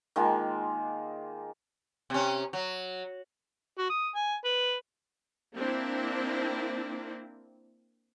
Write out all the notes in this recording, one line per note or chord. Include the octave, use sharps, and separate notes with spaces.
D#3 G#3 A#3 F4
C3 C#4
F#3
F#4
D#6
G#5
B4
A#3 C4 D4 E4